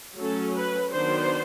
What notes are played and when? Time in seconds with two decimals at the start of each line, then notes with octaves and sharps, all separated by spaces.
0.18 F#3 A3 C#4 A4
0.55 B4
0.91 D#3 F#3 B3 D4 C5